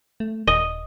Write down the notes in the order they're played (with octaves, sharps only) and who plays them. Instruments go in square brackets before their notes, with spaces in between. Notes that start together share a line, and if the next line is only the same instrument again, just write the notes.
[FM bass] A3
[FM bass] D#1 [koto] D#5